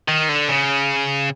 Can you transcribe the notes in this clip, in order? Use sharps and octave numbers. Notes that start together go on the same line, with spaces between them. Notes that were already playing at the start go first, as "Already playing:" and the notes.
D#3
D3
C#3